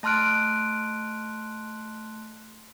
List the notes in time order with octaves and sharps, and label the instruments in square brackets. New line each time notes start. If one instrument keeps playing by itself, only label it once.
[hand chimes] A3 A5 C6 F6 F#6 D7